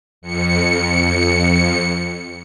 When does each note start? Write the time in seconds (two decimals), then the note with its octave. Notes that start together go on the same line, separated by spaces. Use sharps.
0.22 F2 C#7